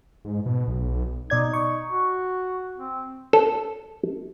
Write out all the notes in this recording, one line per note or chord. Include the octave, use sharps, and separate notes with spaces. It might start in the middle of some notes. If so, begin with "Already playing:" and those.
G#2
B2
B1
B2 D#4 D5 G#6
C#6
F#4
C4
A4